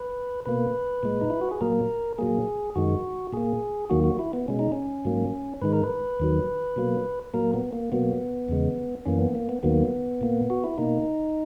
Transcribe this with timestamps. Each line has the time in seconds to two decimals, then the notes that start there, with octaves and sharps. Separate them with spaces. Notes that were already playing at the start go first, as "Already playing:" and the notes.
Already playing: B4
0.46 B2 A#3 B4
1.03 A#2 G#3
1.21 D#4
1.30 E4
1.41 F#4
1.51 G#4
1.61 A#2 F#3 A#3 A#4
2.18 A#2 F#3 A#3 G#4
2.75 F#2 D#3 G#3 F#4
3.32 A#2 A#3 G#4
3.90 D#2 D#3 F#3 A#3 F#4
4.04 F#4
4.19 E4
4.33 B3
4.48 B2 G#3 C#4
4.59 D#4
4.72 C#4
5.05 G#2 F#3 A#3
5.62 G#2 D#3 G#3 B4
5.73 A#4
5.84 B4
6.20 D#2 D#3 F#3
6.76 B2 F#3 A#3
7.34 A#2 F#3 A#3 A#4
7.53 B3
7.73 A#3
7.92 B2 F#3 A#3 B3
8.48 E2 C#3 G#3
9.06 F#2 E3 A#3 C#4
9.21 B3
9.35 A#3
9.49 B3
9.63 D#2 D#3 F#3 A#3 B3
10.21 A#2 A#3
10.50 F#4
10.64 E4
10.78 B2 A#3 D#4